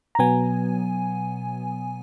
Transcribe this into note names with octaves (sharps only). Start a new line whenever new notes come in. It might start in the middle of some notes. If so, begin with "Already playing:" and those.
A#5
B2 F#3 B3 G#5